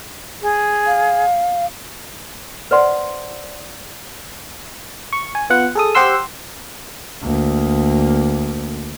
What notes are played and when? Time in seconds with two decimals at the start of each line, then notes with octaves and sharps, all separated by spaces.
0.42 G#4
0.87 F5
2.71 B4 C5 D5 F#5 C6
5.13 C#6
5.35 G#5
5.50 B3 F4 F#5
5.75 G#4 A4 D#6
5.95 G4 C5 F#5 C6 E6
7.22 D2 A#3